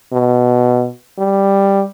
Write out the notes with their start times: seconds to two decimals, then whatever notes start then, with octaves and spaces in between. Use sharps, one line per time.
0.13 B2
1.18 G3